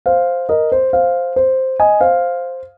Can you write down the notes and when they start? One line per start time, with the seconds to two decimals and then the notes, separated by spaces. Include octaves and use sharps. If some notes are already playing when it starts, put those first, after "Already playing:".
0.06 C5 F5
0.49 A#4 D#5
0.72 C5
0.93 C5 F5
1.36 C5
1.80 D#5 G#5
2.01 C5 F5